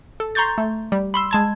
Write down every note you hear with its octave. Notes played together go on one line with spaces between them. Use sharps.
A4
A#5 C6 C#6 G6 A6
A3
G3
B5 C6 E6
G#3 A5 G#6